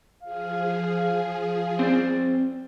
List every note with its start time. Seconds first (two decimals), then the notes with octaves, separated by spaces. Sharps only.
0.23 F3 G#4 F5
1.79 C4 C5 D5